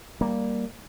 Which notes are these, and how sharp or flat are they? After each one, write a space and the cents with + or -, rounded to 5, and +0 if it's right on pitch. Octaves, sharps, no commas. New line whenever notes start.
G3 +0 A#3 +0